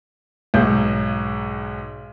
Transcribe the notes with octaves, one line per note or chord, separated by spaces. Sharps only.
B1 G#2 G#4 G6